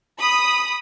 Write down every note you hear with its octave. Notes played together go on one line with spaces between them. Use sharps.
B5 D#6